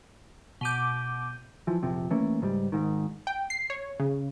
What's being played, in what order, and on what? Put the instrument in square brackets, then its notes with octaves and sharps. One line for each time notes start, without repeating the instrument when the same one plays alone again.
[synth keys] B2 D6 [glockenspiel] G6 D#7 G7
[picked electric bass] E3 F3
F1 A#1 C3 F3
E3 A3 A#3 C#4
C#2 G#2 F3 G3
G#1 G#2 D#3
[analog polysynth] G5
C7
C#5
C#3